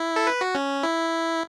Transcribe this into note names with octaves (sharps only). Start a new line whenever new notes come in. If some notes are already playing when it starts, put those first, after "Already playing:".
Already playing: E4
A4
B4
F#4
C#4
E4